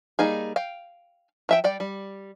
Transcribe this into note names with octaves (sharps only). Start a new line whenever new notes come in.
G3 A#3 D#4 G#4
F5 G5
F3 E5 G5
G3 D5 G5
G3